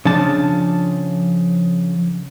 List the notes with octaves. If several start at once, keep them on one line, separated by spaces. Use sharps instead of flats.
C#3 F3 D4 A5